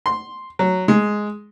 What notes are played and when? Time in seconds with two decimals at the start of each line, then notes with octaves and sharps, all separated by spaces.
0.06 C6
0.59 F#3
0.88 G#3